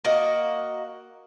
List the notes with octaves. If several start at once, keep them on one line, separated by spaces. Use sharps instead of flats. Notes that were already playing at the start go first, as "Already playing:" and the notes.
A#3 F#4 D#5